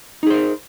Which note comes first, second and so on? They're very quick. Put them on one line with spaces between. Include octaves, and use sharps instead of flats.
D#4 G#4 C5 A#4